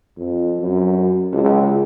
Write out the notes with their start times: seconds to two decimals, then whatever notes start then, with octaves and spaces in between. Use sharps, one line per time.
0.18 F2
0.60 F#2
1.34 C#2